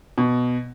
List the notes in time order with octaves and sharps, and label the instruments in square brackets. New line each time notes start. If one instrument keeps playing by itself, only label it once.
[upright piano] B2